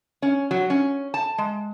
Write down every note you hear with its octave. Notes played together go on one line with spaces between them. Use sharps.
C#4
F#3
C#4
A5
G#3